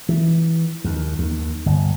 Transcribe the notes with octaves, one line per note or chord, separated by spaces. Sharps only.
E3
D#2
D#2
G1